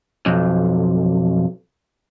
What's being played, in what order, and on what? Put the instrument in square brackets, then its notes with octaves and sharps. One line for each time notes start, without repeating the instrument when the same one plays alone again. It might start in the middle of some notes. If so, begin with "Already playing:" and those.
[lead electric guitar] B1 F2